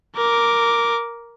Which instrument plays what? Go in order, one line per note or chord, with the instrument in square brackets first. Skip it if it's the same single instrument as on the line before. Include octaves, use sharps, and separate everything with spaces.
[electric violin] A#4 D6